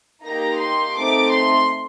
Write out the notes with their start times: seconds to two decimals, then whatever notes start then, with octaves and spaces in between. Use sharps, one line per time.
0.24 A#3 D#4 G4 A#5
0.59 C6
0.95 A3 C4 D#4 D6
1.31 C6